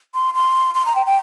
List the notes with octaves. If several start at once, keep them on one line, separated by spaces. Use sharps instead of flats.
C6
C6
C6
A#5
G5
G5